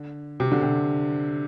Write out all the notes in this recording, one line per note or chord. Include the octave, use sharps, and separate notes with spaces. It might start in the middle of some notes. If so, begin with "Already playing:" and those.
Already playing: D3
C3
D3
C3